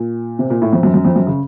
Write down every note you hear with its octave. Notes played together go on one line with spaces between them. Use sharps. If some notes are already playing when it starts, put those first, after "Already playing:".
Already playing: A#2
C3
A#2
A2
F2
F#2
F#2
F2
F#2
C#3